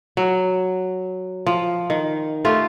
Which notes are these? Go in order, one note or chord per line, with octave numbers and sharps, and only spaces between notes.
F#3
F3
D#3
A3 F4 G4